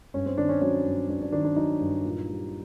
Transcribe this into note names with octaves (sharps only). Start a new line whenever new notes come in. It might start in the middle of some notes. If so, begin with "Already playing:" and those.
G2 C#4
C4
D#3 D4
C#4
F#3 C#4
G2
G2 D4
D4
D#3 D4
D4
F#3 D#4
G2
A#2
G3